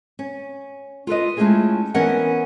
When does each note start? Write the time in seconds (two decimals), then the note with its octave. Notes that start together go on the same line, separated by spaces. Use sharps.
0.19 C#4
1.07 F4 A4 B4 D#5
1.37 G#3 A3 C#4 E4 F4 G#4
1.94 E3 B3 C#4 A#4 D#5 F#5